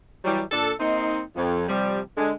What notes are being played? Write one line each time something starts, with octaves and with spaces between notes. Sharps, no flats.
E3 F#3 G3
A#2 D4 A4
A#3 C4 D#4
F2
C3 F3 G3
D3 G#3